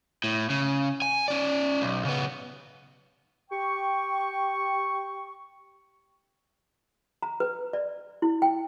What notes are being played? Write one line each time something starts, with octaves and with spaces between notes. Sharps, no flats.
A2
C#3
G#5
C#4 D5
B1
C#3 B3
G4 G5 C#6
A#5
B4
D5
E4
G5